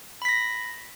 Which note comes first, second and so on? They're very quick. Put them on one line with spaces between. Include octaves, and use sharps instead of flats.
B5 B6 A#6